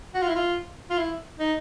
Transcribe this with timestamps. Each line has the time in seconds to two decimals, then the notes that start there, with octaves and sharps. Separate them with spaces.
0.15 F#4
0.22 F4
0.29 E4
0.35 F4
0.90 F4
0.98 E4
1.40 D#4